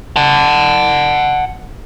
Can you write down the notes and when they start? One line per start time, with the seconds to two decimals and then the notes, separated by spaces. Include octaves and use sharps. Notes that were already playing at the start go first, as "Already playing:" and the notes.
0.16 F#5 A5